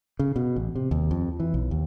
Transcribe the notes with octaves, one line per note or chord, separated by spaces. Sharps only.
C#3
B2
A1
C3
D#2
F2
E3
B1
D#2